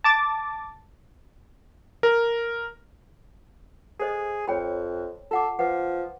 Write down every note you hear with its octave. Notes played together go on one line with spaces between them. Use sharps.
A5 D6 A6
A#4
G#4 A4 C5 D#5
F2 C#5 G5 B5
F4 A4 F#5 D6
F3 B4 F#5